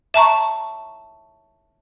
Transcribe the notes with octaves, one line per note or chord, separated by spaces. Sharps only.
E5 A5 A#5 C#6